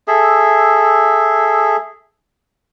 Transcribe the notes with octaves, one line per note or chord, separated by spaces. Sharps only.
G#4 A4 E5